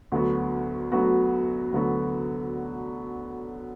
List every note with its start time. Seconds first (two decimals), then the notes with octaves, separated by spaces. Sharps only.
0.12 D2 D3 F#3 B3 F#4
0.92 D2 D3 F#3 B3 F#4
1.72 D2 D3 F#3 B3 F#4